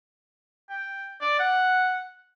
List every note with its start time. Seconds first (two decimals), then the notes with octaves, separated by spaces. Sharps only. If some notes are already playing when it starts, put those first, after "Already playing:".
0.70 G5
1.21 D5
1.39 F#5